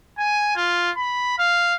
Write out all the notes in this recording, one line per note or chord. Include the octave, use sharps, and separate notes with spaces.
G#5
F4
B5
F5